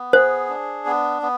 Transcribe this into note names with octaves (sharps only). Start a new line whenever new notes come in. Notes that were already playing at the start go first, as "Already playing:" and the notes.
Already playing: B3
G#4 C5
D4
B3
B3